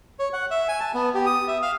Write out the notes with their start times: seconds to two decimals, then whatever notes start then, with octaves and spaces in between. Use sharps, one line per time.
0.19 C#5
0.33 F#5
0.51 E5
0.68 G#5
0.80 A5
0.94 B3
1.15 G4
1.26 D#6
1.48 E5
1.62 F5